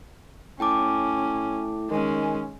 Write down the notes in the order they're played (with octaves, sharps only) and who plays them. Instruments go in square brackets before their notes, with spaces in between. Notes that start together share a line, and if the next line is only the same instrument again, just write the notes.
[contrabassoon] A2 [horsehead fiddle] C#4 [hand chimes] G5 A5 D6
[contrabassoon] D#3 [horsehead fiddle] G#3 C#4